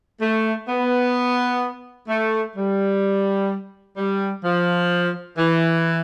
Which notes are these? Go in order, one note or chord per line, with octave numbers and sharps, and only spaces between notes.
A3
B3
A3
G3
G3
F3
E3